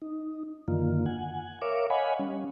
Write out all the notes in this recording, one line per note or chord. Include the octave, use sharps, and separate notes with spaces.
D#4
F#2 D3 D#3 A#3 F4
F#5 G#5
A#4 C#5 E5 F5 D6
C#5 D#5 F5 F#5 G#5 B5
G3 C#4